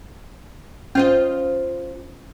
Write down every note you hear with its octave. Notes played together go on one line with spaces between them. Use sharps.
C#4 F4 C5 D#5